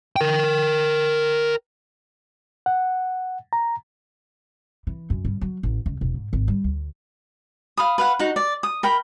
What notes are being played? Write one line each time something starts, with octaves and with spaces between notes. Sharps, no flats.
A#4 G5
F#5
A#5
E3
F#2
G2
F#3
A1
C#2
E1
G#2
G#1
G3
D2
F5 B5 D#6
B4 F5 F#5
D#4 F#4 F#5
D5
D#6
A#4 G5 B5